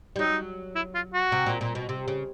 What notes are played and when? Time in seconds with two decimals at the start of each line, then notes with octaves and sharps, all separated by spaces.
0.16 G3
0.19 F#3 D#4
0.75 E4
0.95 F4
1.14 F#4
1.32 C3
1.46 A#2
1.61 A#2
1.75 B2
1.89 C3
2.08 C#3